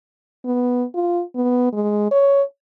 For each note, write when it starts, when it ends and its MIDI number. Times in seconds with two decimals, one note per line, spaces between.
0.45 0.84 59
0.94 1.22 65
1.35 1.73 59
1.73 2.07 56
2.11 2.42 73